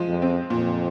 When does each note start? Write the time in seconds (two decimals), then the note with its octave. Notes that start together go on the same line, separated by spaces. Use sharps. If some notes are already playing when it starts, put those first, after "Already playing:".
Already playing: F3 G#3
0.08 F2
0.22 C4
0.50 F2 A#2